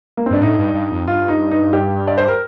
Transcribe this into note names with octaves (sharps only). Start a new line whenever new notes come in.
A#3
C4
G2 D4
A2 D#4
G2
G2
F2
G2 F4
D#4
D#4
G4
D5
C5
A#4